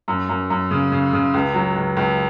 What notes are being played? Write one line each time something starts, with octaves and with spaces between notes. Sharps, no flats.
F#2
F#2
F#2
C#3
C#3
C#3
C#2
F#3
C#2
C#2